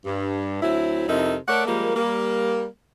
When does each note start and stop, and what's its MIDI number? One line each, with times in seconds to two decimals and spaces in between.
0.05 0.60 43
0.62 1.05 38
0.62 1.05 54
0.62 1.05 60
0.62 1.05 64
1.09 1.35 41
1.09 1.35 48
1.09 1.35 63
1.09 1.35 64
1.09 1.35 69
1.09 1.35 70
1.48 1.64 57
1.48 1.64 69
1.48 1.64 70
1.48 1.64 73
1.48 1.64 74
1.48 1.64 78
1.66 1.91 53
1.66 1.91 55
1.66 1.91 56
1.66 1.91 58
1.96 2.65 55
1.96 2.65 58